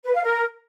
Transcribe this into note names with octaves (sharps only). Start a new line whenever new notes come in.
B4
F5
A#4